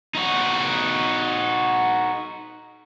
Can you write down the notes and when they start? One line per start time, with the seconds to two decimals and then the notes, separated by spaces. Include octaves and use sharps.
0.15 D#4 F#4